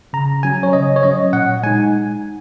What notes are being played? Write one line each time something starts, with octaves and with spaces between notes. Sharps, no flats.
C#3 A#5
F#3 C#4 G#5
C#5
C#3 D#5
C#5
F#3 C#4 D#5
A#2 F#5
G#3 D#4 G#5